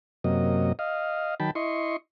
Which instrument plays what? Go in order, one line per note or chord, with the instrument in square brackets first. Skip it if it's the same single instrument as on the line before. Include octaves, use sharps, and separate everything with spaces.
[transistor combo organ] F#2 C3 F#3 A#3 D#5
D#5 F5
D#3 F#3 G5 A5 B5
E4 D#5 C6 C#6